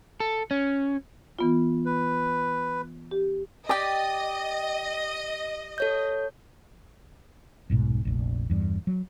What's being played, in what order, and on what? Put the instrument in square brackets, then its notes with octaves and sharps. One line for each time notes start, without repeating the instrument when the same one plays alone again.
[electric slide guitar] A4
C#4
[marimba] E3 B3 F4
[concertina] B4
[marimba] G4
[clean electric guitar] G4 [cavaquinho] D5 G5 [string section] D#5
[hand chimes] A4 C#5 G6
[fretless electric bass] D#1 B1 G#2 B2
F1 A#1
E2 G2
F#3